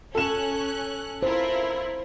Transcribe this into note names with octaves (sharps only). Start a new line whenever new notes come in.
C#4 A4 F#6 E7
E4 F4 A#4 C5